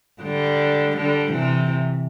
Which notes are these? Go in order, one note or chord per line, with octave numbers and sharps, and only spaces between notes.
D3 G3
D3 G3
C3 E3